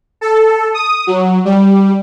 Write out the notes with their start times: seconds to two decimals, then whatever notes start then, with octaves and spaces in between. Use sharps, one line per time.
0.21 A4
0.74 D#6
1.07 F#3
1.45 G3